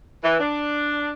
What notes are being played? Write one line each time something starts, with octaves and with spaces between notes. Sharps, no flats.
E3
D4